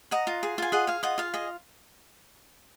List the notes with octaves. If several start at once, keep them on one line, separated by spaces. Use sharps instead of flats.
D#5 F#5 A#5
F4
G#4
F4 G#5
G#4 D#5 F#5
G#4 F5
F4 D#5 F#5
F4 F5
G#4 D#5